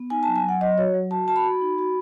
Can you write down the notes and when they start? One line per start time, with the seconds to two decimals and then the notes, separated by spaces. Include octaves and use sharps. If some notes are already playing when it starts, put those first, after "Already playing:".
Already playing: B3
0.10 D#4 G#5
0.23 F#3 A5
0.36 G#5
0.44 F#3 F#5
0.61 F#3 D#5
0.78 F#4 C#5
0.94 F#3
1.11 F#4 A5
1.28 F#4 A5
1.36 B5
1.45 F#4
1.61 D#4
1.78 F#4